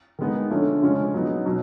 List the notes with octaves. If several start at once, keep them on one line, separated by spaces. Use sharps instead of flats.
D#3 G#3 B3 D#4
D3 F3 A3 C#4
C#3 F3 G#3 C#4
F#3 B3 D#4
B2 F#3